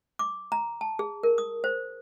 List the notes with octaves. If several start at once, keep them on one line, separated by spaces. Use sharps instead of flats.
D6
A#5
A5
G#4
A#4
D#6
C5